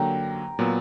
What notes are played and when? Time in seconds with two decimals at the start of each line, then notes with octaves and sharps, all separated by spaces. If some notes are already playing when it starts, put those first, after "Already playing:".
Already playing: D3 F#3 A#3 G5 A#5
0.59 A#2 F#3 B3